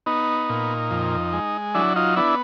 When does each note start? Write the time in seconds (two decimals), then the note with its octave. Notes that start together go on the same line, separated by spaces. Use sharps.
0.06 B3 D#4
0.49 A#2
0.91 F2
1.33 G#3
1.75 F#3 D4 E4
1.96 D#4 F4
2.16 B3 D4 E4